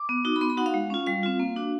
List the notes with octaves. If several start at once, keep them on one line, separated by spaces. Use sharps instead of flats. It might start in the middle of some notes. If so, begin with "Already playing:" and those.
Already playing: D6
B3
D#4 F#4
B5
B3 C6
B5
D#4 F#4 F#5
F5
G#3
C#4 F4
G3 F5
C4 F4
A#3
D4 F#4